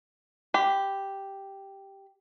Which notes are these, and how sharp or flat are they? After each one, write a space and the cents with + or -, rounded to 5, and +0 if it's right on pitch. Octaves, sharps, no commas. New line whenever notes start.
G4 +0 B5 +40